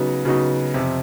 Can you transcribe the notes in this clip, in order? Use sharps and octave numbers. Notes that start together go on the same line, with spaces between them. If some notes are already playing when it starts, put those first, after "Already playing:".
Already playing: C#3 F#3 B3 D#4 F#4
C#3 F#3 B3 D#4 F#4
F2 C3